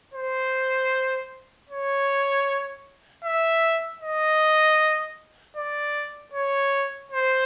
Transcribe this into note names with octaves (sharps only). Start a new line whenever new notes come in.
C5
C#5
E5
D#5
D5
C#5
C5